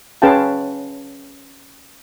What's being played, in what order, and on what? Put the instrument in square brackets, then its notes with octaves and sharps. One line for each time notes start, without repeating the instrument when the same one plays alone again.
[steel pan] C#4 G#4 B4 F5 G5 A5